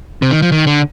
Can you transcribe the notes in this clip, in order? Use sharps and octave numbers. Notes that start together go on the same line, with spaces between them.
C3
D#3
F3
D#3
D3